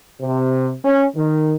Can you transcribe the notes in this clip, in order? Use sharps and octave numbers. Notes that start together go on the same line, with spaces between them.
C3
C#4
D#3